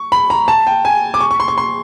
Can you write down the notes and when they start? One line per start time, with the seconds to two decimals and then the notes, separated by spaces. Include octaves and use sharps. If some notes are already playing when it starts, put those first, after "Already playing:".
Already playing: C#6
0.12 B5
0.30 A#5
0.48 A5
0.67 G5
0.85 G#5
1.14 D6
1.20 C#6
1.31 C#6
1.40 C6
1.48 C#6
1.58 C6